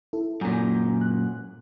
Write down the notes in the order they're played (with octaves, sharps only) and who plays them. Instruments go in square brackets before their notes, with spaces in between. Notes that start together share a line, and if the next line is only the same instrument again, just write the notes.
[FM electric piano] E4 A4
[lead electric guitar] F#2 A#2 [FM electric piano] G#5 A#5 G6
[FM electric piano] F#6